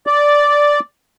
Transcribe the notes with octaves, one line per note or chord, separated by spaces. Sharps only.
D5